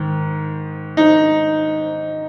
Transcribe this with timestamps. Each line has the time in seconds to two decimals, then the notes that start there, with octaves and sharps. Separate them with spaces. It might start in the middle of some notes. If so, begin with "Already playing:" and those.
Already playing: G#2 D#3
0.97 D#4